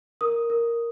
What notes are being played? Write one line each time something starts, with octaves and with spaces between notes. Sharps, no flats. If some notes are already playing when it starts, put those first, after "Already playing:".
A#4 D#6
A#4